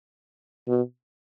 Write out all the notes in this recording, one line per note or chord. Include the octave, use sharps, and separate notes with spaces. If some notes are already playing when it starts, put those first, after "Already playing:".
B2